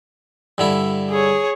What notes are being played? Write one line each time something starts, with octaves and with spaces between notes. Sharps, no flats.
G2 D3 E4
G#4 C#5